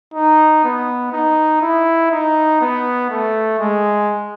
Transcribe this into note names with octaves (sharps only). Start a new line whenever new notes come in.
D#4
B3
D#4
E4
D#4
B3
A3
G#3